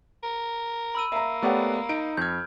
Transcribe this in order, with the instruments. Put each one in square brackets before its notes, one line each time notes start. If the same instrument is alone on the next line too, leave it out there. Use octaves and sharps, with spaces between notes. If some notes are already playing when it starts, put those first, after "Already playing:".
[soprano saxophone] A#4
[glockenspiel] B5 E6 D#7
[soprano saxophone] A#3 [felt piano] E5 A#5
[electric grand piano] A3 B3 D5 [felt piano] G4 C#5 F#5
[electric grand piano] D#4 [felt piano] D7
[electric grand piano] F2 G#6 [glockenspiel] F6 G6